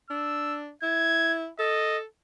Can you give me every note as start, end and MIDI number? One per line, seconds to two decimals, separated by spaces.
0.10 0.70 62
0.10 0.59 88
0.83 1.48 64
0.83 1.34 92
1.59 2.03 69
1.59 1.98 75